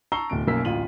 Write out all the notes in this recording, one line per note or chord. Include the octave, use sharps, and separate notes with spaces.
A5 A#5 C#6 E6 C7 G7
D1 B2 D7
B1 F#2 F#3 A#3 E6 B6
D1 A1 F4 F5 D#7 F#7